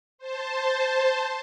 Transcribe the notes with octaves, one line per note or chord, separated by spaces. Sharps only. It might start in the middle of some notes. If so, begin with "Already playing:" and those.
C5 A5